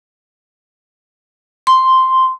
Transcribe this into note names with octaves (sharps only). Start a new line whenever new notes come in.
C6